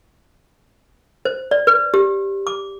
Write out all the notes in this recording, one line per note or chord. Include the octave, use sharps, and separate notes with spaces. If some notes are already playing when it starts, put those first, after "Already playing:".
C5
D5
B4
G4
D6